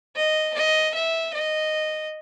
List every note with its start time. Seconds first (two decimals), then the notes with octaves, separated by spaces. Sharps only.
0.15 D#5
0.54 D#5
0.95 E5
1.34 D#5